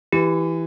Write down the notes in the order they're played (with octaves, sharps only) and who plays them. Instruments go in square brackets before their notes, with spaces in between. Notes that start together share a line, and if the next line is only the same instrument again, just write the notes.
[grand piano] E3 [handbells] G4